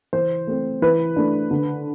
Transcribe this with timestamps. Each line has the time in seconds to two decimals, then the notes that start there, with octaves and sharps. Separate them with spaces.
0.13 E3 C5
0.47 A3 C4
0.82 E3 B4
1.16 A3 D4
1.51 D3